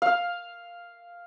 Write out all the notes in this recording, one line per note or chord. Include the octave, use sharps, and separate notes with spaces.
F5